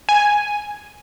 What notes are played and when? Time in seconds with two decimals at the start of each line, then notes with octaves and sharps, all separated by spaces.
0.09 G#5